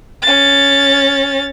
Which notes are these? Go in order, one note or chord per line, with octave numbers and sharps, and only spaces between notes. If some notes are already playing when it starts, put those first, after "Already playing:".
C#4 A6